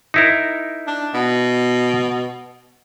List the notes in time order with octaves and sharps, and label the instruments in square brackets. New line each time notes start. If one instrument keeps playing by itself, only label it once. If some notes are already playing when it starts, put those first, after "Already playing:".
[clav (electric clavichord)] D#4 E4 A#4
[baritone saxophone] D4
B2